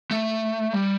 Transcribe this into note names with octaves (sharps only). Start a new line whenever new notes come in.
A3
G3